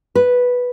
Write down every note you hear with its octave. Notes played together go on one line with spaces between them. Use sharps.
B4